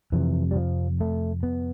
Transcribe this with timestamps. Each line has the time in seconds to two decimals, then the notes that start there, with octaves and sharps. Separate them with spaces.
0.12 F2 C3 E3
0.51 G3
0.56 F3
1.00 A3
1.43 B3